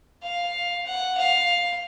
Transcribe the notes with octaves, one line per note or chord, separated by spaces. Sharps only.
F5
F#5
F5